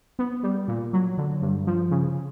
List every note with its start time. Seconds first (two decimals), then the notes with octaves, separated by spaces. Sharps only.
0.19 B3
0.43 G3
0.68 A#2
0.93 F#3
1.18 D3
1.42 G2
1.67 F3
1.91 C#3